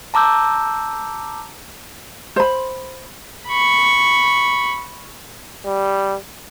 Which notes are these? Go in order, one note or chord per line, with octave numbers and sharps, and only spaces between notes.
A5 A#5 D6 E6 G6
C5 B5
B5 C#6
G3